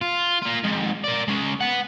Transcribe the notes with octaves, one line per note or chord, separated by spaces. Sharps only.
F4
A#3 F4
F2 G#2
A#4 D5
G#3 C#4
B3 F#5